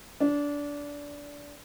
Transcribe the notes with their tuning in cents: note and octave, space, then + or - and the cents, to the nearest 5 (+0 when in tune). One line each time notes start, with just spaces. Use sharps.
D4 -20